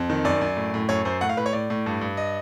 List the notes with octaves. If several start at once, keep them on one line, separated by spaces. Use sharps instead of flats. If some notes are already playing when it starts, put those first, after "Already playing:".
Already playing: F2
D#3
F#2 D5
F#2
A2
A2
F#2 C#5
F#2 C5
A2 F#5
F5
A2 B4
C#5
A2 D5
A2
G2
G2
D#5